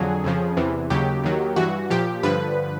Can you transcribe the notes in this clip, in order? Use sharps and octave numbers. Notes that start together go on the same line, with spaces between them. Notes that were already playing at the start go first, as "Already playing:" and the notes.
Already playing: F2 D3 F#3 G#4
F2 C#3 F3
E2 C3 E3
D#2 C#3 F#3 G4
D#2 D#3 F#3
G2 E3 F#4
A#2 F3 G4
G2 D3 F3 B4